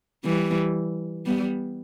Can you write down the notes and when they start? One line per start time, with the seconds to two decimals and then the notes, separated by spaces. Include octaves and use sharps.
0.24 E3 G3
1.26 G3 B3